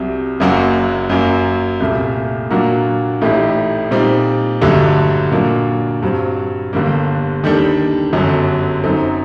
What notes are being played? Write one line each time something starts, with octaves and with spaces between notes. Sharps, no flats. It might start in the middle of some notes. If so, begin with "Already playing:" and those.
Already playing: C2 C3 F#3
F#1 F#2 F#3 A#3 F#4
F#2 F#3 A#3
C2 A#2 A3
A#2 F#3 A#3 D4 F#4
A1 A2 A3 D#4 G4
A#2 G3 C4 D#4
A1 G2 D3 F#3 A3
A#2 F#3 A#3 D4
G2 F#3 C4
G1 G2 D3 G3 A#3
D#2 D#3 G3 D4 A4
G1 F#2 D3 F#3
F#2 F#3 C4 D#4 A4